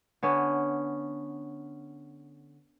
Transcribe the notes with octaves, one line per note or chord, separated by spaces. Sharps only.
D3 B3 C#4